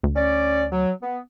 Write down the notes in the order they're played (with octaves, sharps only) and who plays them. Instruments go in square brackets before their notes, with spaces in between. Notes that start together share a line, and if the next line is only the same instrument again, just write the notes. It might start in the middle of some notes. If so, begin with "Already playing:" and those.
[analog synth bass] D2
[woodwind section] C#4 D5
F#3
B3